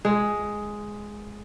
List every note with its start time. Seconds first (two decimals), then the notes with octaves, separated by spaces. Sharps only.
0.05 G#3